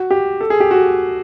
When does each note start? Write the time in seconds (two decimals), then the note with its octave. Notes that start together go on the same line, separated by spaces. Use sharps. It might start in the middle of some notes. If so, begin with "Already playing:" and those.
Already playing: F#4
0.11 G4
0.41 A4
0.50 G#4
0.60 G4
0.71 F#4